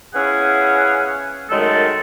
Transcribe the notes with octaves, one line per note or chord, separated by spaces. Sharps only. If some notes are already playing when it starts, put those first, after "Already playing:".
B3 C#4 E4 G#4 F5 F#5
F#2 D#3 G#3 A3 A4